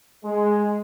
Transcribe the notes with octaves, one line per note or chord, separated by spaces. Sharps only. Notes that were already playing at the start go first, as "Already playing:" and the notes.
G#3